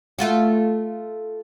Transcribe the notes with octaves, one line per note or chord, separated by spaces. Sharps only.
A3 F4 F#4